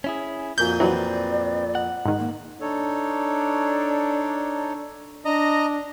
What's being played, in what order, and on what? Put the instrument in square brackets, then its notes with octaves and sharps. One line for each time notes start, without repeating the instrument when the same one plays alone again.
[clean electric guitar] C#4 E4 G#4
[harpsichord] F2 A#2 G#5 [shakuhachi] F#4 [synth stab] G6
[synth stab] E3 F#3 [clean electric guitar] C4 B4 [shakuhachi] D5
[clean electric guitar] F#5
[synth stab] G#2 D#3
[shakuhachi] A#3
[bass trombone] D4 [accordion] D#4 A4 C#5
[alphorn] D4 [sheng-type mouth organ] D#5 A#5